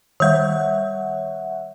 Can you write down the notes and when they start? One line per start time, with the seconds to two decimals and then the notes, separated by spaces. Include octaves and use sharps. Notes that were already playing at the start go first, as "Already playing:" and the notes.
0.20 D#3 G3 C#5 E5 F#5